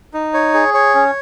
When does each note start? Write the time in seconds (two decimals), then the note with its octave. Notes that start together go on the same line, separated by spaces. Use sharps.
0.14 D#4
0.34 C#5
0.54 G#4
0.74 C#5
0.95 C#4